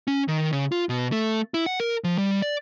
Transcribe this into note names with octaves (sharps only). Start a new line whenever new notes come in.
C#4
D#3
C#3
F4
B2
A3
E4
F#5
A#4
F3
G3
D5